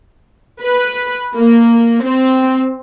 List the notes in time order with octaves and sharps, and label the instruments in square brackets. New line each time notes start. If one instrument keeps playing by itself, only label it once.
[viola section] B4
A#3
C4